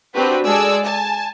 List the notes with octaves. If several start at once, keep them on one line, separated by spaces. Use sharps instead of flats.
C4 D4 F#4 G4 B4
G#3 A4 D5 G#5 E6
G#5 A5